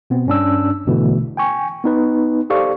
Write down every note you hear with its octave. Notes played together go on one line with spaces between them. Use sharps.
B2 B3 C4
G2 C#4 D4 E6
A#1 G#2 B2 D3 E3 A3
G5 G#5 C#6
B3 D#4 B4
G4 A4 C5 D5 F5 C#6